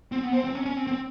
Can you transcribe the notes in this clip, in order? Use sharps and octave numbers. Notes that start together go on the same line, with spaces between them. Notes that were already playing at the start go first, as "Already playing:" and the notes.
C4
B3
C4
C4
C#4
C#4
C4
C4